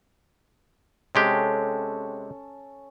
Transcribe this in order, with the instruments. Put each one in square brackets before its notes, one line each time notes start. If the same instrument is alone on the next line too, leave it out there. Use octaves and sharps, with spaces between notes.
[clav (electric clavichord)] C3 G#3 G4 [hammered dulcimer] C#4 A4